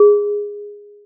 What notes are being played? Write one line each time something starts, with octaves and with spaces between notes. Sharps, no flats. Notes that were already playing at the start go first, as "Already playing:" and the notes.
Already playing: G#4